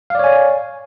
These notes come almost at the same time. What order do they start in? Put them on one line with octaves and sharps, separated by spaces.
F5 D5 C#5 G#5